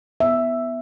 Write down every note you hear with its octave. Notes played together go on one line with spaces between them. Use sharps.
B3 E5